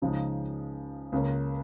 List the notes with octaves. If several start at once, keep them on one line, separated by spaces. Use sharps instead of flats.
C#2 C#3 F3 G#3 D#4
C#2 C#3 A#3 C#4